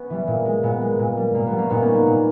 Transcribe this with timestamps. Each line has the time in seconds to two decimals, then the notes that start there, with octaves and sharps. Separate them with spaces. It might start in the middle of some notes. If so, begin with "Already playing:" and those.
Already playing: B3 C#4
0.10 E3 G3
0.27 A#2
0.45 G#3
0.63 A#2 B3
0.81 G#3
0.99 A#2
1.17 G3
1.34 A#2 A#3
1.47 B3
1.53 G3
1.58 A#3 C#4
1.70 A#2 B3 D#4
1.82 A#3 C#4
1.88 G3
1.94 B3
2.06 A#2 A#3